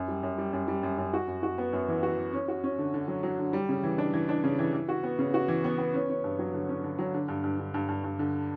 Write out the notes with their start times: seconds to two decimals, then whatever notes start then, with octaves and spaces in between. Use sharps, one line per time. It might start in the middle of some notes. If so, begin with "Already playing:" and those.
Already playing: F#2
0.08 G3
0.23 F#2
0.38 G3
0.53 F#2
0.68 G3
0.83 F#2
0.98 F#2
1.13 F#4
1.28 F#2
1.43 F#4
1.58 B3
1.73 F#2
1.88 E3
2.03 F#4
2.18 E3
2.33 C#4
2.48 F#4
2.64 C#4
2.78 D3
2.94 D3
3.08 F#3
3.23 F#3
3.38 D3
3.53 G3
3.69 C#3
3.83 E3
3.98 D4
4.14 E3
4.29 D4
4.44 C#3
4.59 E3
4.73 E3
4.89 F#4
5.03 B3
5.19 C#3
5.34 F#4
5.48 E3
5.64 B3
5.78 B3
5.94 C#4
6.09 C#4
6.24 G2
6.39 F#3
6.54 D3
6.69 C#4
6.84 D3
6.99 F#3
7.14 D3
7.28 G2
7.44 G2
7.59 D3
7.74 G2
7.88 G2
8.04 G2
8.19 D3